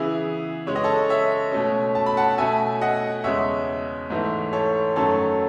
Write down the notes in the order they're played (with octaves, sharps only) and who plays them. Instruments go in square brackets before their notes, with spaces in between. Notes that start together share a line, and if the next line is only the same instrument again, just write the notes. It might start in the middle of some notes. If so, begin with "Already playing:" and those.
Already playing: [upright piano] C#3 E3 B3 E4 G#4
C#3 G#3 C#4 C#5
D#5
A4 C#5
C#5 E5
B2 A3 C#4
A5
B5
F#5 A5
B2 A3 C#4 E5 G#5
D#5 F#5
E2 C#3 G#3 C#5 E5
G#2 E3 A3
A4 C#5
F#2 D#3 F#3 A3 C#4 A4 C#5